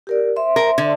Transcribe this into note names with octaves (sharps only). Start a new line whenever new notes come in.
G4 A#4 D5
C5 E5 C6
A#4
D3